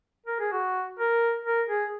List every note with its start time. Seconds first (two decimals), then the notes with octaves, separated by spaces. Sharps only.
0.26 A#4
0.40 G#4
0.52 F#4
0.99 A#4
1.45 A#4
1.69 G#4